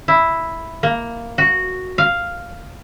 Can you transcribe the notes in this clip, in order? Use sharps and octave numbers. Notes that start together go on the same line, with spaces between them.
E4
A#3
F#4
F5